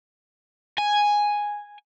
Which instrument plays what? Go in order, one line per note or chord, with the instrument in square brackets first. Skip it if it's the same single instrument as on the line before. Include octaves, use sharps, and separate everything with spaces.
[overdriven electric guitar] G#5